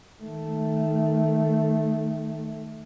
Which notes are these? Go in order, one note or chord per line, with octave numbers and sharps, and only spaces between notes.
D#3 A3